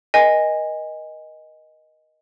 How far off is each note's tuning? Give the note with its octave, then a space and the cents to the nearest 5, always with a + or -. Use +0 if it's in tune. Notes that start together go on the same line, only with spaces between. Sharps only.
A#4 +35 D#5 +0 G#5 -20